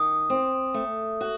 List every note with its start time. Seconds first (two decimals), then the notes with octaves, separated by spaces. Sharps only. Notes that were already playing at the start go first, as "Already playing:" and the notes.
Already playing: D#3 D#6
0.30 C4
0.74 A3
1.21 F#4